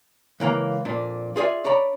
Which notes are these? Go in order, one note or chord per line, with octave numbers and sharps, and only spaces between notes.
C#2 E3 A#3 A#5
F2 A#2 D4
F4 G#4 C#5 D5 E5
D4 C#5 D5 A#5 B5